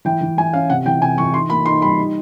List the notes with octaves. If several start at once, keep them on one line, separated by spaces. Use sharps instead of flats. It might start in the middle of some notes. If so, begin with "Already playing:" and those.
E3 G5
E3
E3 G#5
C#4 F5
C3 F#5
E3 G5
C3 G#5
E3 C#6
D#4 C6
A#3 B5
D#4 C6
G3 B5
D#4